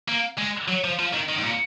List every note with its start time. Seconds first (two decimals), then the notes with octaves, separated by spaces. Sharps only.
0.08 A#3
0.38 G#3
0.68 F#3
0.84 F3
0.99 F3
1.14 D#3
1.29 D#3
1.38 G#2
1.43 A#2